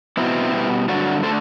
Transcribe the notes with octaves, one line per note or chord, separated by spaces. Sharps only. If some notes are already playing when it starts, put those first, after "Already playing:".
B2 F#3 B3 C4 E4
B2 G3 B3
G2 D3 F#3 D4 F#4
D3 A3 A4 C5